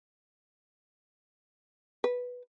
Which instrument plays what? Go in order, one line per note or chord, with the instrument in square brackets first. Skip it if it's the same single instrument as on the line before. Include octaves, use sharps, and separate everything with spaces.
[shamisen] B4